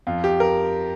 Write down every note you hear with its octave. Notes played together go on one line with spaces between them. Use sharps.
F2 F4
G4
A#4